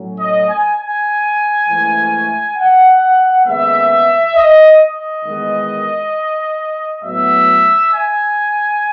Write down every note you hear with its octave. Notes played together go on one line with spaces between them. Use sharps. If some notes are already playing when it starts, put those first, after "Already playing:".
Already playing: A2 F#3 C#4
D#5
G#5
G#5
G#2 E3 A3 C#4
F#5
D#2 C#3 G#3 B3 E5
D#5
D#5
E2 D#3 G#3 B3
A2 F#3 B3 E5
G#5